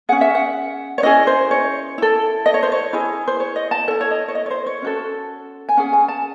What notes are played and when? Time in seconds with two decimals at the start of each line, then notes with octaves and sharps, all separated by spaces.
0.09 C#4 G#4 F#5
0.21 E5
0.35 F#5
0.98 C#5
1.03 C#4 E4 G#4 D#5
1.27 C5
1.51 C#5
1.98 E4 A4
2.46 D#5
2.54 C#5
2.63 C5
2.72 C#5
2.93 E4 G#4
3.28 C5
3.40 C#5
3.56 D#5
3.71 A5
3.88 A4 C#5
3.91 E4
4.01 C#5
4.11 D#5
4.28 C#5
4.35 D#5
4.46 C#5
4.50 C5
4.66 C#5
4.82 C#4 F#4 A4
5.69 G#5
5.77 C#4 G#4 F#5
5.93 G#5
6.08 A5